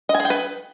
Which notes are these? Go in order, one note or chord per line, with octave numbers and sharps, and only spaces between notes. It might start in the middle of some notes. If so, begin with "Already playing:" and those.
D#5
G#5
G#4
G5
B4